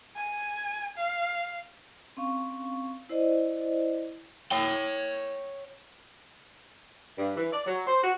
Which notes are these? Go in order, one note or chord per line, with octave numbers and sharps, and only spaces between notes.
G#5
F5
C4 C#4 F5 C#6
E4 C5 D5 D#5
C#5 G5
G2
E3
D5
F#3
C5
F#4